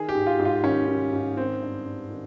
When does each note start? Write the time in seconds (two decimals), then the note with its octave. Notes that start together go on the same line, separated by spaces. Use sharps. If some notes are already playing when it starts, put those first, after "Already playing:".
Already playing: D#3 G#4
0.09 G4
0.15 G#2
0.26 F4
0.39 G#2
0.45 F4
0.64 D#3 C#4
0.88 D#3
1.13 G#2
1.37 D#3 C4
1.62 G2
1.86 G2
2.10 D#3